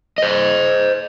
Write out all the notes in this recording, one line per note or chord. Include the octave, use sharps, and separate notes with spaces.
C5 D#5